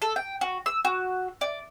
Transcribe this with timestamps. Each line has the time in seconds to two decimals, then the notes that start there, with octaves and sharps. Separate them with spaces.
0.02 A4
0.16 G5
0.41 F#4
0.66 E6
0.85 F#4
1.41 D5